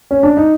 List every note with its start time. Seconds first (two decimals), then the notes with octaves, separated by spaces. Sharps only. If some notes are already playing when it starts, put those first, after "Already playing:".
0.11 C#4
0.23 D4
0.37 D#4